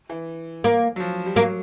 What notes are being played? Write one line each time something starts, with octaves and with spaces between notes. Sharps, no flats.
E3
A#3
F#3
F3
G3
F#3 A#3